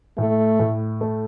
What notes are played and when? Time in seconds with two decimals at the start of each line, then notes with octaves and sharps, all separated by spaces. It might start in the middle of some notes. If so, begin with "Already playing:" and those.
0.18 A2 A3
0.60 A2
1.01 A3